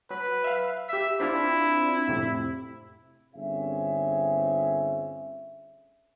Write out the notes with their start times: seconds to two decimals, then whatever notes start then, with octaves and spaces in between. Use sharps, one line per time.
0.10 F#3 B4
0.44 E5 F5
0.89 G4 E5 B6
1.20 C4 D4 E4 F4
2.08 F2 A2 C3
3.34 G1 C4 C#4 G#4 E5